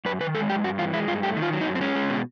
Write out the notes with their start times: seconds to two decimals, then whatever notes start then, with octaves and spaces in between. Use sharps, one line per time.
0.05 F#2 B4
0.20 D#3 B4
0.35 G#3 A4
0.49 F#2 G4
0.64 G2 F#4
0.78 E3 F4
0.93 G#3 E4
1.08 G2 F4
1.23 A3 G4
1.37 D#3
1.42 F4
1.52 F#3
1.61 D#4
1.66 F#2
1.75 C4
1.81 G#3 C#4
1.95 G#3
2.10 B2